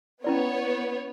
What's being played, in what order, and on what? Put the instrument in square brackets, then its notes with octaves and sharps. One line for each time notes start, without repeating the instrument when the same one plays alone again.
[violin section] B3 C#5 [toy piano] C#4 E4 D5